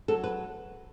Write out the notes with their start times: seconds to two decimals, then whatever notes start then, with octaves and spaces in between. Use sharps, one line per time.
0.08 F#3 A4
0.24 B4